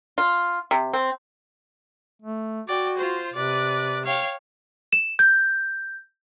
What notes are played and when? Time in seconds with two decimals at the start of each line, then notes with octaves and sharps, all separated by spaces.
0.18 F4
0.71 C3
0.93 C4
2.22 A3
2.67 F#4 D5 G5
2.97 F4 C5
3.34 C3 B4 D5
4.05 C#5 F5 G5
4.93 E7
5.19 G6